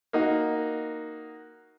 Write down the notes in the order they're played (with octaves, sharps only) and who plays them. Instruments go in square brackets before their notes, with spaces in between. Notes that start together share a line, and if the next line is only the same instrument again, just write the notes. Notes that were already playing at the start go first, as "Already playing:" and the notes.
[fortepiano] A#3 D#4 F#4